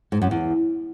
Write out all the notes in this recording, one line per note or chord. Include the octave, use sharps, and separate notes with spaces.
G#2
F#2
E2